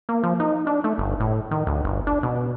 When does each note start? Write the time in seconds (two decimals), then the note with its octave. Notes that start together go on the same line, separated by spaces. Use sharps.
0.09 A#3
0.24 F3
0.40 D#4
0.67 D4
0.84 A3
0.98 G1
1.20 A2
1.51 D#3
1.67 D2
1.84 G1
2.07 D4
2.23 B2